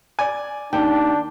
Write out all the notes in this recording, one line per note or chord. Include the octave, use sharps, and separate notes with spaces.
D5 G#5
D#2 D4 G5